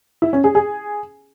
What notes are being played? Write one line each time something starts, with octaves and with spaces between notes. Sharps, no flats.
E4
C#4
G#4
G#4